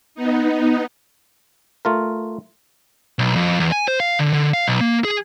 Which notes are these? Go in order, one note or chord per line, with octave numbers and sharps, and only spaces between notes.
B3 D#4
A3 F4 A#4
B1
F2
E2
G#5
C5
F5
D3
D3
F5
B1
A#3
G#4